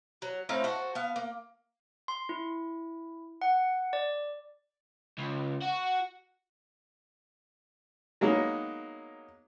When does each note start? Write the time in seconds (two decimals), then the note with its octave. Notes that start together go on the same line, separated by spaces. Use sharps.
0.22 F#3
0.49 A2 C4 D#4 F5
0.64 F#4 A4 C5
0.95 B3 F5
1.16 A#3
2.08 C6
2.29 E4
3.41 F#5
3.93 D5
5.18 C#2
5.62 F#4
8.21 F#3 G#3 A#3 B3 D#4